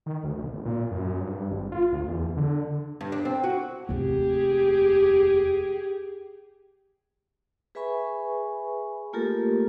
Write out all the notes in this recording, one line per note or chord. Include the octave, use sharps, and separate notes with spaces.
D#3
D2
B1
G#1
A#2
F#2
G2
G#1
F4
D2
E2
D3
G2
D4
C4
F#4
F1 D#2 G4 G#4
G#4 B4 E5 G#5 B5 C#6
A3 A#3 F4 G4 A4 A#4